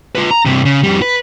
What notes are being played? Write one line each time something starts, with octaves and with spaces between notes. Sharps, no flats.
F4 B4
A#5
G2 C3
C#3
F2 G3
B4